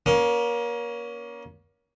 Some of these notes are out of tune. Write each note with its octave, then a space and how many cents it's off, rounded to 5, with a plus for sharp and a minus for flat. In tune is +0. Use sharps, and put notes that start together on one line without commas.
A#3 +30 C#4 +25